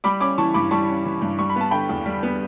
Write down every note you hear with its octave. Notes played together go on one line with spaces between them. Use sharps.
G3 B5 D6
C#4 B5 D6
E3 A5 C#6
G2 B5 D6
G3 A5 C#6
C#4
E3
G2
G3 C#6
B5
B3 A5
D3 G5 B5
E2
G3
B3